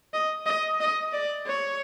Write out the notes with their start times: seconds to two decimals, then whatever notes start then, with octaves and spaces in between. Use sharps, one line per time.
0.13 D#5
0.46 D#5
0.81 D#5
1.13 D5
1.47 C#5